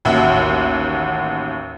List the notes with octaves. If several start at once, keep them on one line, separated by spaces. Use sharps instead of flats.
A1 D#2 F#4 E5